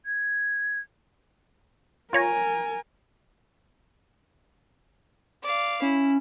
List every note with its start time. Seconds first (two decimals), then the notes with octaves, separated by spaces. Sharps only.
0.06 G#6
2.13 F4 A#4 C#5 G#5 A#5
5.43 D5 F5
5.82 C#4 E4